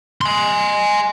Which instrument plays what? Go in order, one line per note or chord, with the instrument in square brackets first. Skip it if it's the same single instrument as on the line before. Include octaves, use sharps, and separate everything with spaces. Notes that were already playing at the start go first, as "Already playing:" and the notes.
[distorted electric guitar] G#5 C6